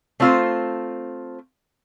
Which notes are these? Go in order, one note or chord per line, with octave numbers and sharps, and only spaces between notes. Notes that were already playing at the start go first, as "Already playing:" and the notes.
A3 C4 F4 C5